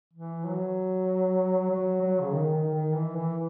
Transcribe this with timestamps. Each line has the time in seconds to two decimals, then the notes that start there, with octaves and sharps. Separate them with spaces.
0.14 E3
0.45 F#3
1.70 F#3
2.01 F#3
2.21 C#3
2.33 D#3
2.54 D#3
2.75 D#3
2.95 E3
3.16 E3